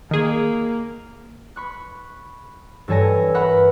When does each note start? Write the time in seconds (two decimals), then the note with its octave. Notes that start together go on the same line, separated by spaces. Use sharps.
0.11 D#3 A#3 G#4
1.56 B5 C#6 F#6
2.88 G2 E3 A4 C#5 G#5 A#6
3.34 A#4 B4 E5 F#5 B5 C#6